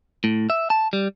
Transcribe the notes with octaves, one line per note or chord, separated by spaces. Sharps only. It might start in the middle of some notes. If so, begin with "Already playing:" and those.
A2
E5
A5
G3